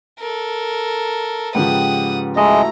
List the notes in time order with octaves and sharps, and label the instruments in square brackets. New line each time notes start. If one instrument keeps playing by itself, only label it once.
[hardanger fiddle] A4 A#4
[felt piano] G#2 C#3 F3 [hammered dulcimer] G4 B4 G5 [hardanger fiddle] F#5 D#6
[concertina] G#3 D#5 [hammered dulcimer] A3 E4 F#4 [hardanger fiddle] A#5